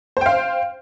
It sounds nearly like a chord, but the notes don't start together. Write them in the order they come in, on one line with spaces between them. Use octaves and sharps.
C5 G5 F5